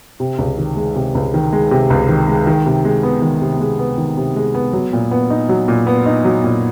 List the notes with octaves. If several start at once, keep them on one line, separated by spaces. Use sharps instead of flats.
C3
C#2
D#3
G#3
C3
C#2
D#3
G#3
C3
C#2
D#3
G#3
D#3
C3
G#3
B3
D#3
C3
G#3
B3
D#3
C3
G#3
B3
F#3
A#2
B3
D#4
F#3
A#2
B3
D#4
F#3
A#2